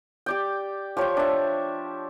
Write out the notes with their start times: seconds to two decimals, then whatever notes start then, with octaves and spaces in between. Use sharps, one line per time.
0.26 G4 D5 G5
0.97 F3 G4 C#5 G5
1.17 D4 E5